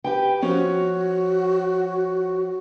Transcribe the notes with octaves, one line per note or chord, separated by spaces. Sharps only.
G4 B4 G5
F3 C#4 F#4 C#5